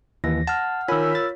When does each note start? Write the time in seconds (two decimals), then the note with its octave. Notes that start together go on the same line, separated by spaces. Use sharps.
0.24 D#2 E3 A#6
0.47 F#5 A5 F6
0.88 D#3 F4 A#4 C#5 G#5 B5 E6 B6
1.15 A6